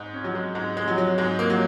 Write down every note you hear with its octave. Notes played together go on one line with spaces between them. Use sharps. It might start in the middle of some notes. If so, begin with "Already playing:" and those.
Already playing: G#2
C#4
F#3
G#3
G#2 G#3
G#3
F#3
F#3
G#2 G#3
A#3
F#3